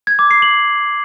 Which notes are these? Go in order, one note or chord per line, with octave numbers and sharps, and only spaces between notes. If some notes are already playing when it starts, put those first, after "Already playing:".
G#6
D6
C7
F#7